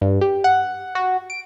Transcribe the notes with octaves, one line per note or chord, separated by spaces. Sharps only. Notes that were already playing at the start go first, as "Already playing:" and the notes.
G2
G4
F#5
F#4
D7